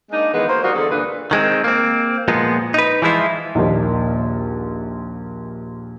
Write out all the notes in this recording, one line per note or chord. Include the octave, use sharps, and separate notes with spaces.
G#3 A#3 D4 D#4
D#3 E3 G#3 A#3 B3
A#3 F#4 C5
F#3 G3 D#4 F4 F#4
E2 D3 G#4 A4
D2 G2 A#2 D4 B4
D#3 G#3 C4
A#3 C4
A#2 F3 G#3 B3
D#4 B4
E3 F3 G#3 E4 F4
A#1 D#2